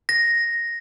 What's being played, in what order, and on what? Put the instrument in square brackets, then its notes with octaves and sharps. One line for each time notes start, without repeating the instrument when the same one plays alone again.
[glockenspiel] A#6